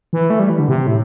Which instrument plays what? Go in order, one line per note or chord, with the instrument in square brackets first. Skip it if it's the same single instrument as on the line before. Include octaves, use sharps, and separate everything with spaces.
[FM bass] E3
A3
G3
E3
D3
C3
A2